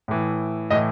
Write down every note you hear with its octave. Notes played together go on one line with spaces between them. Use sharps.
A2 E3
A2 E3 D#5